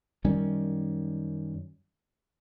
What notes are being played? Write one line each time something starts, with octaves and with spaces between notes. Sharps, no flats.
F#2 D#3 G3 C#4